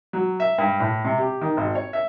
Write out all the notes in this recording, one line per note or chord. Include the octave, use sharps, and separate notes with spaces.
F#3
E5
G2
A2
C3
G4
D#3
G#1
C#5
E5